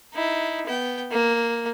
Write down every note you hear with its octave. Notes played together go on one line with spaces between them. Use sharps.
D#4 E4
B3 G5
A#3